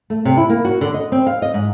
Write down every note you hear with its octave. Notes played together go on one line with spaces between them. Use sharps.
A3
C3
E4
A#3
F#4
D3
D#5
C4
F5
D#5
G#2